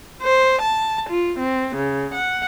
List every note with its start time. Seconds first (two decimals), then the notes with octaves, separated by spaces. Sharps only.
0.22 C5
0.62 A5
1.09 F4
1.39 C4
1.76 C#3
2.14 F#5